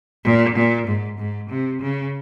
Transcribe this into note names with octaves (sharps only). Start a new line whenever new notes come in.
A#2
A#2
G#2
G#2
C3
C#3